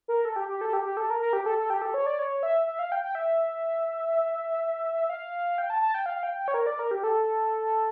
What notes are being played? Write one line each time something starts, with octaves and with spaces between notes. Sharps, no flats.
A#4
A4
G4
G4
A4
G4
G4
A4
A#4
A#4
G4
A4
A4
G4
A4
C#5
D5
C#5
E5
E5
F5
G5
G5
E5
F5
G5
A5
A5
G5
F5
G5
G5
C#5
A#4
D5
A#4
G4
A4